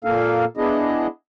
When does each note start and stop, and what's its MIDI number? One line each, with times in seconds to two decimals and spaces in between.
0.04 0.45 46
0.04 0.45 58
0.04 0.45 69
0.04 0.45 77
0.57 1.07 59
0.57 1.07 62
0.57 1.07 64
0.57 1.07 68
0.57 1.07 75